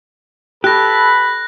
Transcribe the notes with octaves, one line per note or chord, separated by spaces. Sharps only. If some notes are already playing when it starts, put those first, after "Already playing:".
G4 A4 B4 B5 F#6 A#6